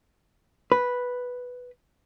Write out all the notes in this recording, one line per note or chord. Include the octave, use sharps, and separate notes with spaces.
B4